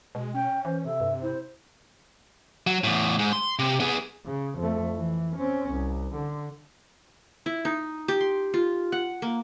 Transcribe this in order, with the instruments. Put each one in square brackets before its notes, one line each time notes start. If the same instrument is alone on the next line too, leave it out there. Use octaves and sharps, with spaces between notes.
[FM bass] B2 [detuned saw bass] G#3
[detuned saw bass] C#4 [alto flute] G5
[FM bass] E3 [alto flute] C5
[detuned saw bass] C3 [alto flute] A4 [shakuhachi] E5
[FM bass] G2
[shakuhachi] E4 [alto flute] C5
[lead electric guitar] F#3
E2 A2
G#2
C6
C3
B3 G#4
[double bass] C#3
F2 A3
E3
C4 C#4
C2
D3
[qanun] E4
D#4
G4
C6
F4
F#5
A#3